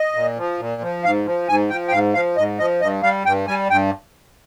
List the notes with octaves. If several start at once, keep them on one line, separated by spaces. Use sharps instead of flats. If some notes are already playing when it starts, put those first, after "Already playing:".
Already playing: D#5
A#2
F3
A#2
F3
G#2 F5
F3
G#2 G#5
F3 G5
G5
G#2 F5
F3 F5
G#2 D#5
F3 D#5
G2 D#5
G3 F5
G2 G5
G3 G#5
G2 G5